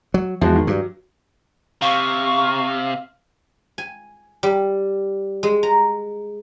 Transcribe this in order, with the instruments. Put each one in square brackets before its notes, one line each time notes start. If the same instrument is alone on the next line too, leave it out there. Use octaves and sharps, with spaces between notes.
[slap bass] F#3
[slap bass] E2 [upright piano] F3 G#3 F#4
[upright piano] D#3
[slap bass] G2 [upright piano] F#3
[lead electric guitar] C3 [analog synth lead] F5 [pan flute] C#6
[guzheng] G#5
G3
G#3
A#5